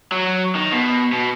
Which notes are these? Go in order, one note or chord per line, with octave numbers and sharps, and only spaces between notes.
F#3
D#3
B2
B2